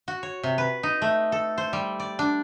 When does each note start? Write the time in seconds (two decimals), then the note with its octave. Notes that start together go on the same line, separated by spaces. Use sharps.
0.08 F#4
0.23 C#5
0.43 C3
0.58 B4
0.83 D#4
1.02 A3
1.32 A4
1.58 C5
1.73 G3
2.00 D5
2.19 D4